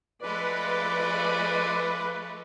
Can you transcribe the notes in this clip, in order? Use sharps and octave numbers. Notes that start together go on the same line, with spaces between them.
F3 G#3 A3 B4 D5